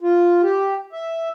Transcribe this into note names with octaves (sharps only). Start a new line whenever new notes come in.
F4
G4
E5